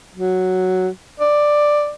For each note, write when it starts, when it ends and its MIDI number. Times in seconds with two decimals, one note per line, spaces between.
0.14 0.89 54
1.20 1.92 74